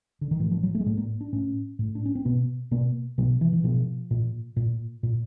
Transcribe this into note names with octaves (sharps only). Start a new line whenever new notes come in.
D3
D#3
A2 E3
F3
F#3
A3
G#3
A2 A3
A#3
D4
A2 C#4
A2
D4
C#4
C4
B2 B3
B2 A#3
B2 F#3
E3
E3
B2 F3
A#2
A#2
A#2